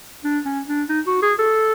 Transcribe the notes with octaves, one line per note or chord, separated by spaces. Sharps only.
D4
C#4
D4
D#4
F#4
G#4
A4